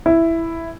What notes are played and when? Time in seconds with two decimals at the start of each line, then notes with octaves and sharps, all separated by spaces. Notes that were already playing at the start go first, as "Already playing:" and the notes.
0.06 E4